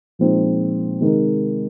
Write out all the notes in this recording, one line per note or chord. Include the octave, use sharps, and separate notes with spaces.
A#2 F3 G#3 C4 D#4
C3 D#3 G#3 D#4 A#4